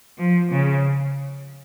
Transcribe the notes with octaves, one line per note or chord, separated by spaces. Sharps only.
F3
C#3